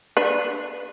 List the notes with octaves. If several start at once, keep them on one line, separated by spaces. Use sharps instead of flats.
D4 B4